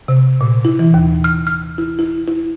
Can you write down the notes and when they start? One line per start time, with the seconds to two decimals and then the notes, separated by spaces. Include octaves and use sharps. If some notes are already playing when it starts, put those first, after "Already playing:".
0.08 C3
0.41 A#2
0.65 E4
0.79 E3
0.94 D#2
1.24 F6
1.47 F6
1.78 E4
1.99 E4
2.28 E4